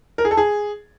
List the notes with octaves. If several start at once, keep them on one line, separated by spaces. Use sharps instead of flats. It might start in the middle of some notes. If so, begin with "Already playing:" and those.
A#4
G#4
A4
G#4